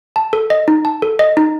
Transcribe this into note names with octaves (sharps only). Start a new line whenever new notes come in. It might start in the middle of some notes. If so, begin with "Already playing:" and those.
A5
A4
D#5
D#4
A5
A4
D#5
D#4